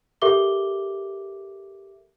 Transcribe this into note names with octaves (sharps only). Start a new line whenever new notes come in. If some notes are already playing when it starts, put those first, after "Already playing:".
G4 A4 A#4 E5 D6 G7